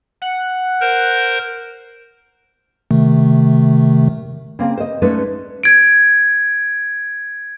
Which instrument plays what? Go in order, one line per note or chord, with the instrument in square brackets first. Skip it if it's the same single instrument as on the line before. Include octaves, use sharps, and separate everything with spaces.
[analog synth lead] F#5
[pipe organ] A#4 C5
[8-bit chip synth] C3 D#3 A3
[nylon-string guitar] C#3 A#3 C4
C5 D#5
G#3 A3 C#4 D#4 B4 D5
[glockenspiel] G#6 D7